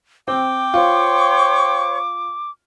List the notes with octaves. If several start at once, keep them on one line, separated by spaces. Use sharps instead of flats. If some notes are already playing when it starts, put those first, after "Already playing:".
C4 G5 D6
F4 C5 C#5 C#6